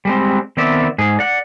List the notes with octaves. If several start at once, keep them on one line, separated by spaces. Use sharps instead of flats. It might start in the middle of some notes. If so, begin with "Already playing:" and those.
G3 G#3 C4
D#3 B3 C4 D5 E5
G#2 G#4
D5 F#5